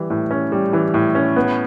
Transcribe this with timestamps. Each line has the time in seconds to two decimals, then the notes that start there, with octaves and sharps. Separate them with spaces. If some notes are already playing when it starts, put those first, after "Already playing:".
Already playing: E3 G3
0.10 A2
0.31 C#4
0.52 G3
0.73 E3
0.94 A2
1.15 C#4
1.36 B3